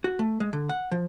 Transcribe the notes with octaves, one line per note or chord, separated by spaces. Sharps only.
F#4
A3
G#3
D3
F#5
F3